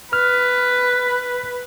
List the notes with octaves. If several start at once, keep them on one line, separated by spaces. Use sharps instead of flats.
B4 F6